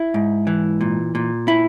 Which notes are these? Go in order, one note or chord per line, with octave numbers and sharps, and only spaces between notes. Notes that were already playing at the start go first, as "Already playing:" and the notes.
Already playing: E4
G#2
E3
A#2
A#2
E4